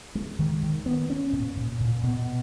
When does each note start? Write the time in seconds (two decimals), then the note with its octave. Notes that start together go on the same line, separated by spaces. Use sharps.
0.15 G#3
0.39 D#3
0.63 D#3
0.86 B3
1.10 C#4
1.33 A#2
1.56 A#2
1.80 A#2
2.03 B2